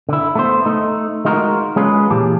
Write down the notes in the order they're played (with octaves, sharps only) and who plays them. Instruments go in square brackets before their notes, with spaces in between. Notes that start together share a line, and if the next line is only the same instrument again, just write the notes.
[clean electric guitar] D3 E4
A3 B3 C5
A3 D#4
G#3 D#4 F4 F#4 G#4 A#4
G#3 C#4 F4 B4
A#2 E3 G4 A5